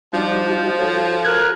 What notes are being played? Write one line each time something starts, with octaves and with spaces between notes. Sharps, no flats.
F3 G3 D4 D#4 F#4
F#4 A4 C#5
A#4 F#6 G#6